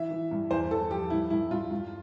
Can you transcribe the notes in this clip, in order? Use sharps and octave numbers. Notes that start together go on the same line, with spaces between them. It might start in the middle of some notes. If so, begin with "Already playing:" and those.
Already playing: E3 E5
E3
G2
E2 C5
E2 A4
F3 G4
G2 E4
G2 E4
G2 F4
G2